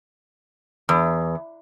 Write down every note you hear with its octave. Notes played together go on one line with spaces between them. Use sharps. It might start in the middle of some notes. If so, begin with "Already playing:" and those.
E2